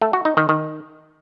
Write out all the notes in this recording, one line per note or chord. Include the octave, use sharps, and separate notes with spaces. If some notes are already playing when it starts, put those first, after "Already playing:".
A3
F#4
D#4
D#3
D#3